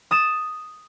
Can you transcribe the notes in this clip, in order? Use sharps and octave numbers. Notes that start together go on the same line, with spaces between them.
D#6 A6 E7